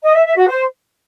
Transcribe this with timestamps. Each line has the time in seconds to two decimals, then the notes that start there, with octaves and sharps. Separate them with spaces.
0.03 D#5
0.14 E5
0.25 E5
0.36 F#4
0.47 C5